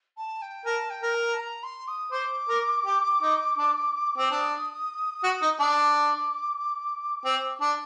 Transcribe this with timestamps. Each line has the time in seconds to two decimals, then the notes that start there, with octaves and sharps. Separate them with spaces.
0.17 A5
0.42 G5
0.66 A#4 A5
0.90 G5
1.02 A#4
1.14 A#5
1.34 A5
1.39 A#5
1.64 C6
1.88 D#6
2.12 C5 D6
2.49 A#4
2.86 G4
3.22 D#4
3.58 D4
4.18 C4
4.31 D4 D#6
5.23 F#4
5.42 D#4
5.60 D4
5.78 D6
7.25 C4
7.61 D4